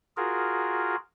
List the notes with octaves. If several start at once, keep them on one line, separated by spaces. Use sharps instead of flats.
F4 F#4 G#4 A#4